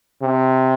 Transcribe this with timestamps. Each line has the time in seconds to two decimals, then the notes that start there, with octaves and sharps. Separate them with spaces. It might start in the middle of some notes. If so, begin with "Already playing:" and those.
0.22 C3